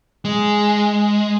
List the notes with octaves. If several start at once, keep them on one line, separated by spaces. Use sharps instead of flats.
G#3